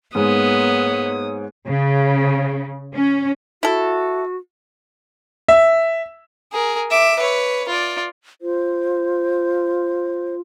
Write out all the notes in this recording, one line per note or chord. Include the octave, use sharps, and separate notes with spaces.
G#2 G#3 A#3 B3 C#5 D#6
C#3
C#4
E4 F#4 A4
E5
G#4 A#4
E5 D6
B4 C#5
F4 D5
F4 C5